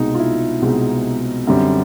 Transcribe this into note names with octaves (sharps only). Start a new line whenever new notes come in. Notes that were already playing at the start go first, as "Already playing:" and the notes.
Already playing: C2 B2 G#3 C4 D#4
F4
E4
C2 B2 G#3 C4
F#2 D3 G3 C4